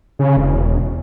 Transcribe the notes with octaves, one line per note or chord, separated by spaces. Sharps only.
C#3
E1